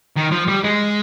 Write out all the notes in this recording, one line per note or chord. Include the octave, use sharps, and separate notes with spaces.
D#3
F3
G3
G#3